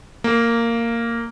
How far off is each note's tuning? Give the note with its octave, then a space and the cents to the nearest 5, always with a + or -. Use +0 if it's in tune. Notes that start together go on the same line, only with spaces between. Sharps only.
A#3 -10